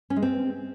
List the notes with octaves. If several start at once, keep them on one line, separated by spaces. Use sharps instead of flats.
C#4
G#3
C4